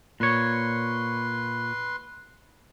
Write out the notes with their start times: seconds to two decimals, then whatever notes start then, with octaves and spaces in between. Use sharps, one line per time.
0.20 A#2 B4 C#5 C6